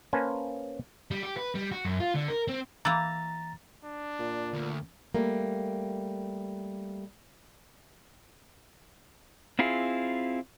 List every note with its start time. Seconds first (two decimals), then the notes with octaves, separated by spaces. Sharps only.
0.13 A#3 C#4 B4 C5 G#5 A5
1.11 G3
1.23 G4
1.37 B4
1.55 G3
1.72 F#4
1.85 F#2
2.00 F4
2.15 D3
2.28 A#4
2.48 C4
2.85 E3 A#3 A#5 A6
3.84 D4
4.19 A#2
4.54 D2
5.15 G3 A3 A#3
9.59 C4 E4 F4 G#4